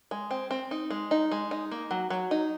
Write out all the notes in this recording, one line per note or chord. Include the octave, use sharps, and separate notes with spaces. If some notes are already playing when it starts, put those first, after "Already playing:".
G#3
C4
C4
D#4
G#3
D#4
G#3
D#4
A#3
F#3
F#3
D#4